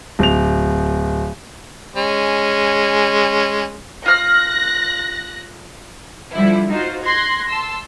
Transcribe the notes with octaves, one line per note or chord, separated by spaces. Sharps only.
D1 F7
G#3 C#4
F4 F6 F#6 A#6
D3 F3 G3 E4
D#4 F4 F#4 C5
C6 F#6 G#6 A#6
A5 C6 E6